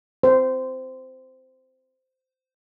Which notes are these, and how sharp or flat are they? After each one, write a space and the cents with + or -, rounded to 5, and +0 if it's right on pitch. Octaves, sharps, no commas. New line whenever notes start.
C5 -10